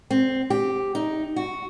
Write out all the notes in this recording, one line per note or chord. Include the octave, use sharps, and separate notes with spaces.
C4
G4
D#4
F#4